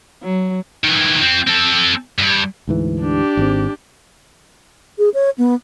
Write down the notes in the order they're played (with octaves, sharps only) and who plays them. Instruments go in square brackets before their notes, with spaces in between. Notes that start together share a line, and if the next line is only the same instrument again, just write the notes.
[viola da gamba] F#3
[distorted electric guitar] D#3 E3
F3 C4
C4 A4
G2
[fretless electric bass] D2 G#2 E3
[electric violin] D4 G4
[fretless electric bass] G#1 G#2 C4
[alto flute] G#4
C#5
B3